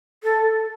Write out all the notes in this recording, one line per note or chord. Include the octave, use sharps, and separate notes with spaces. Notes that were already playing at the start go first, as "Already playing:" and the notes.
A4